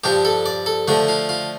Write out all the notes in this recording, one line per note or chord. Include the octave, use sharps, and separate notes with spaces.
G2 F3 D4 G4
A4
D5
A4
D3 F3 A3 D4
F4
F4